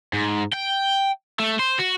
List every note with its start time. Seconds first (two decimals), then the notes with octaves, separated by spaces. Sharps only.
0.13 G#2
0.53 G5
1.39 A3
1.60 C5
1.79 F#4